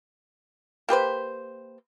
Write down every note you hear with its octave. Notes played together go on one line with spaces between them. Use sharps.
A#3 G4 B4 C5